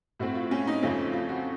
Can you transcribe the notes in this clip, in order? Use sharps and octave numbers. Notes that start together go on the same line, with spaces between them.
A2 A3 C4 F#4
F4
C#4
D#4
F2 C#3 F3 A3 C4 C#4
F4
F#4